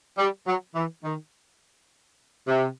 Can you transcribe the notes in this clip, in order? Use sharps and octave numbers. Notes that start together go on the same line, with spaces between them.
G3
F#3
E3
D#3
C3